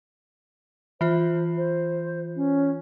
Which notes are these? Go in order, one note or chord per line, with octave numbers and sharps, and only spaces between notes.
E3 F4 C5
C5
C#4